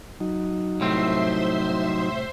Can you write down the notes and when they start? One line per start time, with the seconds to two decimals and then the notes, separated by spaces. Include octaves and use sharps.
0.20 F#3 D#4
0.80 C2 A2 C4 C5 E5 C6